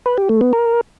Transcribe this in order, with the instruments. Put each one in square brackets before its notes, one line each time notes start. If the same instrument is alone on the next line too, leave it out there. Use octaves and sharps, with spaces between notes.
[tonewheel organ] B4
G4
A3
B3
A#4